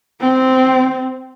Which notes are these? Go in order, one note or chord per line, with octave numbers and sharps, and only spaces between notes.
C4